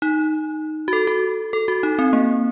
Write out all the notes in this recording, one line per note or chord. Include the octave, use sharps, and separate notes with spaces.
D#4
F#4
A4
F#4
A4
F#4
D#4
C4
A#3